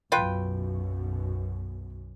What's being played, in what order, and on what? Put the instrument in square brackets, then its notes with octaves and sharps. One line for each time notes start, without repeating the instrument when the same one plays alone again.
[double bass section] B1 F#2 B2 [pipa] F4 B4 G5